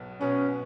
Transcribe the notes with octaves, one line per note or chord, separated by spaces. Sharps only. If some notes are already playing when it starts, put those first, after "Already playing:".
Already playing: B1 B2 B3
B2 B3 C#4